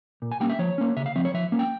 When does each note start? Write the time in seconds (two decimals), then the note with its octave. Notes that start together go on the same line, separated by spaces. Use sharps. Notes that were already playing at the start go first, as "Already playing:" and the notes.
0.22 A#2
0.32 G#5
0.40 G3 A#3 C#4 G5
0.50 E5
0.59 F3 C#5
0.78 A#3 C#4
0.97 C#3 E5
1.06 F5
1.16 F3 C4 E5
1.25 C#5
1.34 F3 E5
1.52 A#3 C#4
1.59 G5